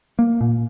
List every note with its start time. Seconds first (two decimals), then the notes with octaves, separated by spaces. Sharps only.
0.19 A#3
0.41 A#2